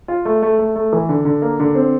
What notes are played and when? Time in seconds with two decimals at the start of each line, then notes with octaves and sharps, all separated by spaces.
0.08 F4
0.25 A3
0.42 A3
0.59 A3
0.76 A3
0.93 E3
1.09 D3
1.25 D3
1.42 A#3
1.60 D3
1.75 C4